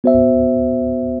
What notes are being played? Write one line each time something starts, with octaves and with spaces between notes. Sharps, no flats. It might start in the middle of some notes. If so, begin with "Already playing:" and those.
B3 F#4 C5 E5